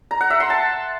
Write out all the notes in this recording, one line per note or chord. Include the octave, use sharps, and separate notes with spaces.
A#5
F#5
E5
C6
A5